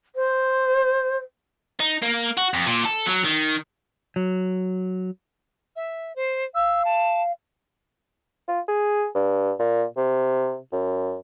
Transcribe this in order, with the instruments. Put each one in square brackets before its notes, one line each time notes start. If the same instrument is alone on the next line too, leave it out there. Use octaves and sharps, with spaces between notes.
[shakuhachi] C5
[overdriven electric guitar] D#4
A#3
F#4
F2
A#2
A4
F#3
D#3
[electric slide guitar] F#3
[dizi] E5
C5
[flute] F5 [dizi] E6
[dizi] A5
[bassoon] F4
G#4
G2
A#2
C3
F#2